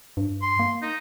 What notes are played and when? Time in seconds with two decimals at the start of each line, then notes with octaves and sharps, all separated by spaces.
0.17 G2
0.42 C6
0.59 A#3
0.82 D#4